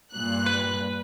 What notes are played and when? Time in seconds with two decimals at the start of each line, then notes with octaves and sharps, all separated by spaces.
0.12 G2 A#2 F#6
0.46 B4